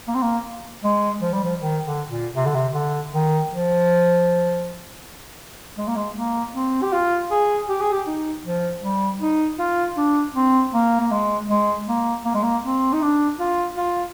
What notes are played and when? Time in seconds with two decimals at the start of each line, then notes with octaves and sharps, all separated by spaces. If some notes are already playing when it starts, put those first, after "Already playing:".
0.08 A#3
0.15 C4
0.22 A#3
0.84 G#3
1.21 F3
1.33 G3
1.44 F3
1.60 D#3
1.85 D3
2.10 A#2
2.36 C3
2.45 D3
2.55 C3
2.74 D3
3.12 D#3
3.49 F3
5.78 G#3
5.88 A#3
5.96 G#3
6.16 A#3
6.54 C4
6.82 G4
6.92 F4
7.31 G#4
7.69 G4
7.80 G#4
7.92 G4
8.07 D#4
8.45 F3
8.83 G3
9.21 D#4
9.59 F4
9.97 D4
10.34 C4
10.73 A#3
11.00 A#3
11.11 G#3
11.50 G#3
11.88 A#3
12.25 A#3
12.34 G#3
12.43 A#3
12.64 C4
12.93 D#4
13.02 D4
13.39 F4
13.77 F4